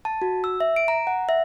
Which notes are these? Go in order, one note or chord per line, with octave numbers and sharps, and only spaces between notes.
A5
F#4
E6
E5
D7
A#5
F#5
E5